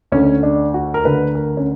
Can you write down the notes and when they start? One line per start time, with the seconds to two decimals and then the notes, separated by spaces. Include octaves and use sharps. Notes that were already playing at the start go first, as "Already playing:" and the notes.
0.12 D2 D3 C#4
0.43 D4
0.74 F#4
0.94 A#4
1.04 D2 D3 B4
1.35 A#4
1.57 C#4